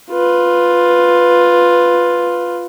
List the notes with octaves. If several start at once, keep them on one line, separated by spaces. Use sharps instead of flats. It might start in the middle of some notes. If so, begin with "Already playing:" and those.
F4 B4